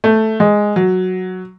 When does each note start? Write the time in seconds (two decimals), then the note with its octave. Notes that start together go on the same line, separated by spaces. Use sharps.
0.04 A3
0.40 G#3
0.76 F#3